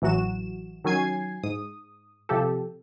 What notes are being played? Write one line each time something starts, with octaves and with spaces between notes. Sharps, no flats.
A1 E3 F#3 F#4 E7
D#3 F#3 C#4 G#5 G#6 C7
G#2 D#6
C3 F3 G4 A4